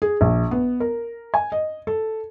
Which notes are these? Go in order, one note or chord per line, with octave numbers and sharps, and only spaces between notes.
G#4
A#1
B3
A#4
G#5
D#5
A4